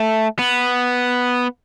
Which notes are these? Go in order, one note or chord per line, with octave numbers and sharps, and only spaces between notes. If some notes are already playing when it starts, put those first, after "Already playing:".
Already playing: A3
B3